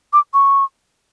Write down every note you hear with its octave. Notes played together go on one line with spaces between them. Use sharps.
D6
C#6